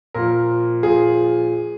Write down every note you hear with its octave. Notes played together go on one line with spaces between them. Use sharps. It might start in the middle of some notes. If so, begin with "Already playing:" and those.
A#2 F3 A#4
A#2 F3 G#4